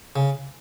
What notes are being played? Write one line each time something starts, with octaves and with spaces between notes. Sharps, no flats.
C#3